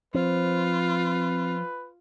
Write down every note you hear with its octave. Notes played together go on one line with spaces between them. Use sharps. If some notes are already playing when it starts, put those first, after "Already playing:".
F3 C4 F4 B4